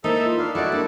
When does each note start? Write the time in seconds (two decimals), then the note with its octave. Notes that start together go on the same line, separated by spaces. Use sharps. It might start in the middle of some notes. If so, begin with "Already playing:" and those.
0.04 A#3 D#4 E4 A4 C5 E5
0.23 F4
0.39 D4 B4 F5
0.55 G3 D4 E4 F#4 A4 D5 D#5
0.72 G3 A#3 C4 D4